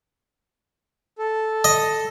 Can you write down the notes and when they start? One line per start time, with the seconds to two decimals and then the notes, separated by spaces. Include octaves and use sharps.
1.18 A4
1.64 D#5